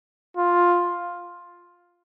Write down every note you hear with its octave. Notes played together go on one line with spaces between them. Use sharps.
F4